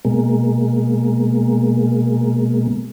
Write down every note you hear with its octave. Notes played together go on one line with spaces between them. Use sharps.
B2 G#3 A#3